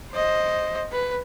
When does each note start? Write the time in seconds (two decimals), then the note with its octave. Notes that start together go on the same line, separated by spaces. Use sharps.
0.12 C5 D#5
0.92 B4